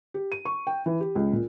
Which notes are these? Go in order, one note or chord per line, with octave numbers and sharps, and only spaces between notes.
G4
D#7
C#6
G5
E3
G4
C#2
A#2